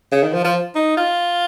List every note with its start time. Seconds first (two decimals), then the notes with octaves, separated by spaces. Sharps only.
0.12 C#3
0.23 D#3
0.33 F3
0.44 F3
0.75 D#4
0.97 F4